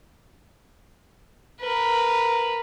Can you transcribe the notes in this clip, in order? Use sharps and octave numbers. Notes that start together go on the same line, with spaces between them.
A#4 B4